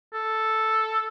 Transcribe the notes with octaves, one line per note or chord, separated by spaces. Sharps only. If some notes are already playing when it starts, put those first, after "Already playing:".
A4